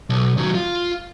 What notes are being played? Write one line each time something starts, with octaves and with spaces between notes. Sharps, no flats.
B1
D#3 F#3
F4